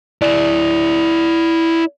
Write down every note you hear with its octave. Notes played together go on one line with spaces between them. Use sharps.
E4 D5